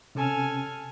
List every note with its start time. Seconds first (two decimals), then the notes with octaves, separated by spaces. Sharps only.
0.15 C3 C#4 A4 G#5 F6